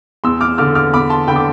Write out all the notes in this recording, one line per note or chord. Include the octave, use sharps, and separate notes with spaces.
E2 C6 E6
D6 F6
D3 D6 F6
D6 F6
E2 B5 D6
A5 C6
D3 G5 B5
D6